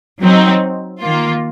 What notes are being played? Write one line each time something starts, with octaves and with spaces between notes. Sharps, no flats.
F#3 C4 D#4
D#3 A#3 F4